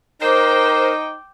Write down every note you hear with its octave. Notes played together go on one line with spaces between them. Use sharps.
D#4 A#4 C5 G5 D6